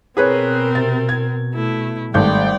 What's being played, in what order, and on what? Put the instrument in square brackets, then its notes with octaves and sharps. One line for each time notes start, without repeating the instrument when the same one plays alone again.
[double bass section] B2 [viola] C4 A#4 [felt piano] G#4 B4 C#5
[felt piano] C3 A6
G#6
[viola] A3 E4
[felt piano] G#1 A3 G6 [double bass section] G3 [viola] D5 G5